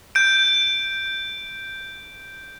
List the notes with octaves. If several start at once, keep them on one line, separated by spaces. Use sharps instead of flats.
G6 D7